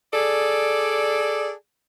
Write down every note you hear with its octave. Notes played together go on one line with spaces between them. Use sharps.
G#4 A4 D5